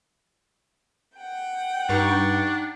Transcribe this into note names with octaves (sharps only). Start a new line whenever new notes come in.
F#5 G5
G2 D4 D#4 C#6